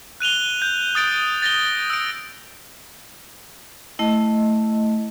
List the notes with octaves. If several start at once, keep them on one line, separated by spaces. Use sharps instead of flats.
F#6 D#7 F7 G7
G6
D#6 A6 D7
A6 A#6 G7
E6 D7
A3 E4 D#5